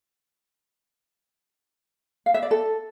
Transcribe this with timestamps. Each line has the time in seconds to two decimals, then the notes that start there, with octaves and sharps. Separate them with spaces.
2.26 F5
2.34 E5
2.43 D5
2.51 A4